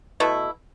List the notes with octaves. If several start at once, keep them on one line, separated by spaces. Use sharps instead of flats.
B2 A3 E4